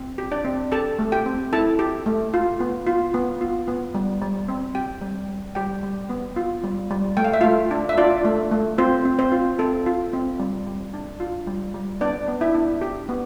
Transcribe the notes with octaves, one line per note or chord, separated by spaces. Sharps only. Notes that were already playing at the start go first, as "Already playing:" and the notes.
Already playing: C4
G4
D4 D5
C4
G4 A4 A5
A3
G4 G5
C4
E4 A4 A5
G4
A3
F4
B3
F4
B3
F4
B3
G3
G3
C4
G4 G5
G3
G3
G3 G4 G5
G3
B3
F4
G3
G3
A3 G5
F5
E5
A3 F4 F5
D4
E5
D4 F4 D5
A3
A3
C4 F4 C5
C4
C4 C5
F4
C4 A4
F4
C4
G3
G3
D4
F4
G3
G3
B3 D4 D5
B3
E4 E5
D4
G4
B3